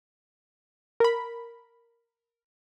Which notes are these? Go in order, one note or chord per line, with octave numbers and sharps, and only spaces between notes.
A#4 B5